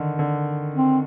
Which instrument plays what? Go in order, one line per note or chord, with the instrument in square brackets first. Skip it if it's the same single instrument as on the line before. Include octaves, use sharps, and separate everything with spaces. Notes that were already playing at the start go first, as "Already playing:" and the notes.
Already playing: [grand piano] D3 D#3
D3
[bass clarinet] C4